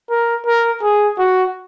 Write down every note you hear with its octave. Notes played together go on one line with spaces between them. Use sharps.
A#4
A#4
G#4
F#4